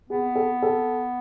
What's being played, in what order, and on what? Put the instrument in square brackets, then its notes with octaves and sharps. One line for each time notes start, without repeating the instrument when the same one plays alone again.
[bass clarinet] B3 [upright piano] G#4
[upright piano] A4
A4